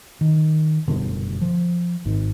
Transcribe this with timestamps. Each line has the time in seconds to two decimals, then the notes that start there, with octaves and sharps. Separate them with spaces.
0.21 D#3
0.88 F#1 B2 D3 G3
1.41 F3
2.05 G#1 G#2